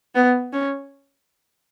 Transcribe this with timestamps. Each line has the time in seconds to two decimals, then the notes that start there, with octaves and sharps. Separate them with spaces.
0.15 B3
0.53 C#4